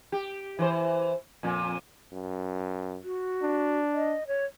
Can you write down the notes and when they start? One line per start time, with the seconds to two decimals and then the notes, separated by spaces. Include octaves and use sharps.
0.12 G4
0.59 E3 C5
1.43 F2 A#2
2.12 F#2
3.03 F#4
3.43 D4
3.93 D#5
4.27 C#5